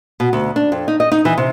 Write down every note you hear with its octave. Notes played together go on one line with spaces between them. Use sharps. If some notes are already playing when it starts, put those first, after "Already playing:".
B2
D2
D4
F2
D#4
D#5
D#4
E3
C3